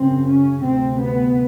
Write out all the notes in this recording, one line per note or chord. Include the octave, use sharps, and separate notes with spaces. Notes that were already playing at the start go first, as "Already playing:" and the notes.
Already playing: F#2 C#3 C4
C#4
D2 C3 C4
B3